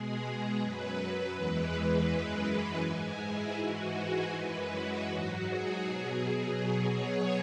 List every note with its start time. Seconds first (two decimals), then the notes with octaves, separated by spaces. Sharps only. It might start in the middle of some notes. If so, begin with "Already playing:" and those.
Already playing: B2 G#3 G#4
0.58 F#2 F#3 B4
0.96 B4
1.33 E2 E3 G#3
2.08 F#2 E3 G#3 B4
2.82 G#2 G#3 G#4
3.19 E4
3.57 G#2 E3 G#3 F#4
3.95 G#4
4.31 F#2 E3 G#3 B4
4.69 F#4
5.06 G#2 F#3
5.43 G#4
5.81 B2 F#3
6.55 B2 F#3
6.92 C#5